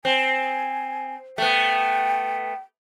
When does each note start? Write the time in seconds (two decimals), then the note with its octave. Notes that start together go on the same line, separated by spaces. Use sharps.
0.05 C4 G#5
1.38 A3 B3 G5